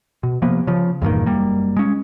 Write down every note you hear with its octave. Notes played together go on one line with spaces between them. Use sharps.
B2
C3 F3 A#3 B3
C#3 F3
E2 G2 A#2 D#3
F#1 G3 A#3
G#3 C#4